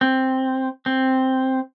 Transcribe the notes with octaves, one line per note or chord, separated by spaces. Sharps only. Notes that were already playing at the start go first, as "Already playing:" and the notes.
C4
C4